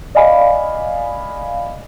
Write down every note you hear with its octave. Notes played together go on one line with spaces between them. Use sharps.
D5 D#5 F5 G#5 B5